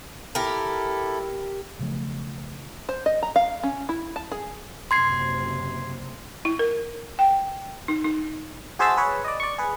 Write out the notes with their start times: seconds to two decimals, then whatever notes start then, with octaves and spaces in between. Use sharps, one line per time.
0.35 E4 G4 A4 A#4
1.79 B1 C#3 F3 A3
2.89 C5
3.06 D#5
3.22 A#5
3.36 F5
3.63 C#4
3.89 E4
4.16 A5
4.31 G#4
4.91 F#1 C3 C6 G#6 C7
6.45 E4
6.59 A#4
7.19 G5
7.88 D#4
8.04 D#4
8.79 F#4 G#4 C5 E5 A5 E6
8.97 G#4 B4 C#5
9.25 D5 D#5
9.40 D5 C#6
9.58 G#4 B4